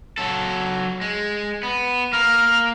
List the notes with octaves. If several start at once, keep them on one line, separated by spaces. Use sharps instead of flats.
F#3 A4
G#3
B3
A#3 F6